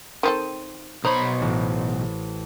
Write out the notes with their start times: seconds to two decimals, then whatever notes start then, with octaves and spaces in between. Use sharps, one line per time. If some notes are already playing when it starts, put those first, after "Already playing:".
0.23 D#3 C4 A4 D#7
1.05 B1 D#4 C5 C#5 B5
1.41 A1